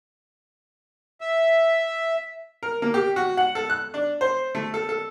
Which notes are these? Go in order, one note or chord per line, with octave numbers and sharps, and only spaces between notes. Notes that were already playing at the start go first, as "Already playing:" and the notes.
E5
A#4
A#3
G4
F#4
F#5
A4
F#6
D4
C5
A3
A4
A4